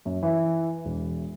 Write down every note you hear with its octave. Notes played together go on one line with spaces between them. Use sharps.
F#2
E3
E1